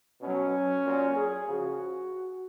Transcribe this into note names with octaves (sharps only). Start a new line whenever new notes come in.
B2 F#3 C#4
A#2 F#3
G#4
C#3 F3 F#4